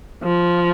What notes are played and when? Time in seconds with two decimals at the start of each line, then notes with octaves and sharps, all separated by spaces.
0.23 F3